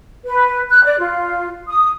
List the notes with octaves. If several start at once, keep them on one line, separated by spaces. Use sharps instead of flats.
B4
F#6
D5
F4
D#6